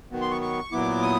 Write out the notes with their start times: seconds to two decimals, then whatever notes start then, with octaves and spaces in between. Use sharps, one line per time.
0.11 D#3 F#3 B3
0.21 C6
0.31 C#6
0.42 C#6
0.72 A#2 F#3 B3 E4 D6
1.02 D#6